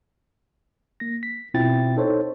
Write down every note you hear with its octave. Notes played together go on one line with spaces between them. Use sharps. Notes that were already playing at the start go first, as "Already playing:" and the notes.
A#3 A#6
B6
B2 C4 E4 F4 G5 A6
D#4 A4 C5 C#5